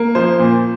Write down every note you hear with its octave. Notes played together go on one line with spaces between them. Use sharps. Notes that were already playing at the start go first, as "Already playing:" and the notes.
Already playing: A#3
F3 C5
A#2